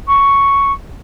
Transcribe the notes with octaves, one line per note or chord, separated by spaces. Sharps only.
C#6